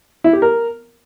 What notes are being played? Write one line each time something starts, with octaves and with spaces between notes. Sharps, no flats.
E4
G4
A#4